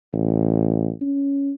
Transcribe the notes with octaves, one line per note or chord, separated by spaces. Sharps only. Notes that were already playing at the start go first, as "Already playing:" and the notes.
A1
C#4